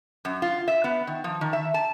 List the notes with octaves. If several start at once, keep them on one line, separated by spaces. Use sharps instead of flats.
F#2
F4
E5
B3
D#3
F3
D#3
E5
A5